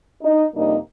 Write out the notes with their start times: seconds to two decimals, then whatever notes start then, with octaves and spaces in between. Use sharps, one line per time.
0.23 D#4
0.54 F2 C3 G3 A#3 D4 D#4